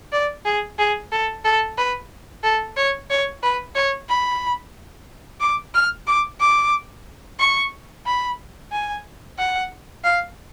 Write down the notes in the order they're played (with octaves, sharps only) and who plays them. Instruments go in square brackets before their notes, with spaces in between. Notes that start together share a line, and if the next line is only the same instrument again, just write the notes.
[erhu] D5
G#4
G#4
A4
A4
B4
A4
C#5
C#5
B4
C#5
B5
D6
F6
D6
D6
C#6
B5
G#5
F#5
F5